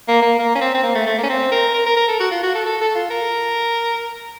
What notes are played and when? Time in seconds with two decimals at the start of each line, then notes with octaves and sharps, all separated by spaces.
0.08 A#3
0.22 A#3
0.39 A#3
0.55 C#4
0.61 C4
0.74 C4
0.83 A#3
0.95 A3
1.06 A3
1.18 A#3
1.23 C#4
1.29 C4
1.52 A#4
1.74 A#4
1.86 A#4
1.97 A#4
2.08 A4
2.20 F#4
2.31 F4
2.43 F#4
2.55 A4
2.65 A4
2.81 A4
2.95 F4
3.10 A#4